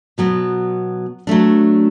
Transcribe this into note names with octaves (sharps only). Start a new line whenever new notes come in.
B2 F#3 B3
F#3 A3 D4